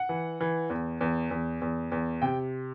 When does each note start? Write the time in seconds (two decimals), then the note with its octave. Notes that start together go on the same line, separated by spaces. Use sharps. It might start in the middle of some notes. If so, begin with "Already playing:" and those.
Already playing: F#5
0.09 E3
0.41 E3
0.70 E2
1.01 E2
1.31 E2
1.62 E2
1.92 E2
2.22 C3 G5